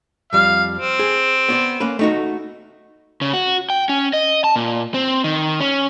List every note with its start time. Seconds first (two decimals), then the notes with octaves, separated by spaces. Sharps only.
0.33 F2 G3 F5
0.77 C4
0.99 G#4
1.49 B3 C#5 D5
1.80 A#3 C#4 B4
1.99 A3 D#4 F#4
3.21 C#3
3.33 F#4
3.70 G5
3.89 C#4
4.13 D#5
4.44 A5
4.56 A#2
4.94 C4
5.24 D#3
5.60 C#4